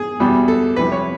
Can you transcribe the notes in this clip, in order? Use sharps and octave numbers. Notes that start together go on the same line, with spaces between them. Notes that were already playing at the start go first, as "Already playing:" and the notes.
Already playing: G#4
E2 B2 G3
A4
F2 C3 E3 G3 B4
C#5